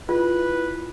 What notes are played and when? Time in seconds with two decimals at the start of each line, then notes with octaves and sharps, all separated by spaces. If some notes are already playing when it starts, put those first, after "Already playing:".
0.09 E4 F4 B4